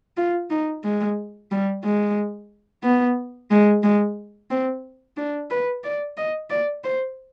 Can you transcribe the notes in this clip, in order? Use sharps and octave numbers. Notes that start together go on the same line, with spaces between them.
F4
D#4
G#3
G3
G#3
B3
G#3
G#3
C4
D4
B4
D5
D#5
D5
C5